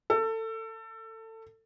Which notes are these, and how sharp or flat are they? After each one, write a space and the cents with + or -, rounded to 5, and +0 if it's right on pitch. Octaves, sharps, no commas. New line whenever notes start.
A4 +25